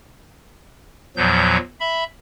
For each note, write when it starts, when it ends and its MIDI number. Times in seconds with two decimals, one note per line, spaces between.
1.17 1.57 40
1.17 1.57 46
1.17 1.57 53
1.17 1.57 54
1.17 1.57 91
1.80 2.04 76
1.80 2.04 83